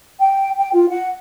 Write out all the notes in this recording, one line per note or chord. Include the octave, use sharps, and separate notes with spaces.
G5
G5
F4
F#5